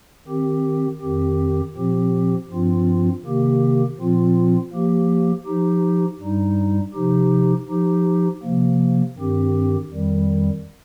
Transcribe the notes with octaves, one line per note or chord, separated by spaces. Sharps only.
D#3 C4 G4
F2 D#3 C4 G4
A#2 F3 C4 G4
G2 F3 C4 F4
C3 D#3 A#3 G4
A#2 F3 C4 F4
F3 A#3 G4
F3 D#4 G4
G2 G3 D#4
C3 F3 D#4 G4
F3 D#4 G4
C3 F3 A#3
G2 D#3 C4 G4
F2 D#3 G3